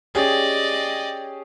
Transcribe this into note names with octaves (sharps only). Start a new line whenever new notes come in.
C#4 G4 G#4 D5 D#5